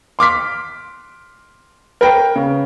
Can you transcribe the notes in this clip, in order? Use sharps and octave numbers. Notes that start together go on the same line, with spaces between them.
C6 D6 F6 B6
A#4 B4 G5
C#3